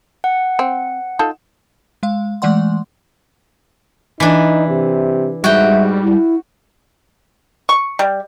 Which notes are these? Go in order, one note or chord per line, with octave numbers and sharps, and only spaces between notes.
F#5
C4
D#4 F4 A4
G#3 F5
E3 G#3 A3 D5 F#5 C6
E3 D4 D#4
C3
G#2 G3 F#4 E5 G5
E4
C#6
G3